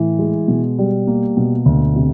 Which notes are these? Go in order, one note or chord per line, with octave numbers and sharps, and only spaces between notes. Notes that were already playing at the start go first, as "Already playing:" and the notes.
Already playing: A2 E3
G#3
B2
G3
A#3
B2
D2
C3